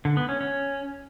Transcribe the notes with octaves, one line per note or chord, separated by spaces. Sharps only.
D3
B3
C#4
C#4